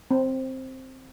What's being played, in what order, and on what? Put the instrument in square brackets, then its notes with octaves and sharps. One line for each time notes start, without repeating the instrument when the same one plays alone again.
[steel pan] C4